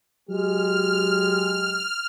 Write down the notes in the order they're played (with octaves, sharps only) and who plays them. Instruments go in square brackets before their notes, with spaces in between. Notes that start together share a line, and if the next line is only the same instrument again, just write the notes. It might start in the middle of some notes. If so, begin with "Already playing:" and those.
[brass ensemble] F#3 G#3 G4 [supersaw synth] F6